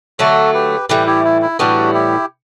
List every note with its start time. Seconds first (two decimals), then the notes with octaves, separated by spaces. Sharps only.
0.19 D3 F#3 A3 F#4 A4
0.54 G4 B4
0.89 A2 E3 G3 G4 B4
1.07 E4 G4
1.24 E4
1.42 E4
1.59 A2 E3 G3 B3 D4 F#4
1.94 E4 G4